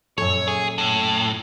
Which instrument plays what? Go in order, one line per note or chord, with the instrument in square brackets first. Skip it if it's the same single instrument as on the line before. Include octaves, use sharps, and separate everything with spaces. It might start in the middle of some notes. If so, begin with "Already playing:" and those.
[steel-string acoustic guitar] F#2 A#2 A4 [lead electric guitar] C#5
[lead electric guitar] G#4
A2